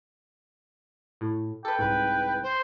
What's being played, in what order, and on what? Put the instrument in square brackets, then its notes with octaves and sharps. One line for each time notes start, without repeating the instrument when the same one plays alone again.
[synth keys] A2
[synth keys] A4 B4 [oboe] G5
[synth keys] C2 G#2 [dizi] B4
[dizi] C5